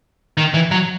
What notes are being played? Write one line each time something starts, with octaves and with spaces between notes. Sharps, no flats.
D#3
E3
F#3